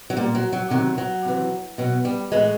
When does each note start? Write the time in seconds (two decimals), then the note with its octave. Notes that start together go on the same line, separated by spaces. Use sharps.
0.10 F#3
0.17 A#2 G3
0.35 F#3
0.53 F#3
0.70 C3 D#3 F#3
0.98 F#3
1.25 C3 E3
1.78 B2 F#3
2.05 G3
2.32 A2 E3 G#3